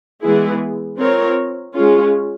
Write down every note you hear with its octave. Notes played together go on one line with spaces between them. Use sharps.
E3 G#3 B3 E4 G#4
C4 F4 A#4 C#5
G#3 C#4 F4 G#4